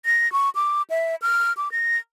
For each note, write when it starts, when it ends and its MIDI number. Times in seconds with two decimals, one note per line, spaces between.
0.05 0.31 94
0.32 0.50 85
0.55 0.82 86
0.90 1.15 76
1.22 1.53 89
1.57 1.71 86
1.72 1.97 94